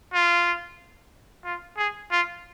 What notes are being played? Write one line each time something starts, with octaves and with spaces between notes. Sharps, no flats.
F4
F4
G#4
F4